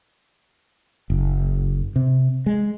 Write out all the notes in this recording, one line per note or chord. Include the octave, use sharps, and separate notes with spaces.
F#1
C3
G#3